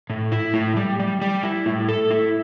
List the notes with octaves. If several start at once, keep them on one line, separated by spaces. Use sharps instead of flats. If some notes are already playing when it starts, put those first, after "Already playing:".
A2
E4
A2
G3
G3
G3
E4
A2
A4
E4